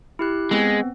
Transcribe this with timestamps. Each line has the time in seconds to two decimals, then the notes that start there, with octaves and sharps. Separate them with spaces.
0.19 E4 G4 F#6
0.51 G#3 B3 C4